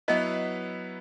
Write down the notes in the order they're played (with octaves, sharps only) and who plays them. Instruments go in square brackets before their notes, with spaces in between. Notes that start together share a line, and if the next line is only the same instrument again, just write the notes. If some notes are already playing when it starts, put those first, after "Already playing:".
[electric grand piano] F#3 B3 E4 B4 [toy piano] D#5